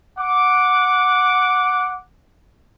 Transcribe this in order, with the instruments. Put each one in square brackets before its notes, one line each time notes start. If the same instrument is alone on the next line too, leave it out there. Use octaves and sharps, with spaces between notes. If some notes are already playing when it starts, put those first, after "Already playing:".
[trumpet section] F#5 D6